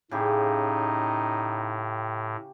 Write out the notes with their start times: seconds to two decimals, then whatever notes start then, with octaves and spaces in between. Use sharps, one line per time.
0.11 A2 C#3 D#4 G4